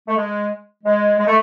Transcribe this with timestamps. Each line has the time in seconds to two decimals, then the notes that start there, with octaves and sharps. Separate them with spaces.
0.08 A3
0.16 G#3
0.84 G#3
1.18 G#3
1.27 A3